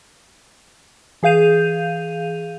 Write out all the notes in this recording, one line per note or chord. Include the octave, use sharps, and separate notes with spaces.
E3 G#4 F5 G6 D#7 F7